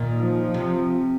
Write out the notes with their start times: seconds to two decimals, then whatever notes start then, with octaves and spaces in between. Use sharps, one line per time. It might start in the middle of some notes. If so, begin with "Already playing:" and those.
Already playing: A#2 D#3
0.17 F3
0.54 C3